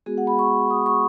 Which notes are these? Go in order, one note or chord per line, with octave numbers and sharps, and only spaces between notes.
G#3 B3 F#4 G#4
F#5
B5
C#6
D#6
C#6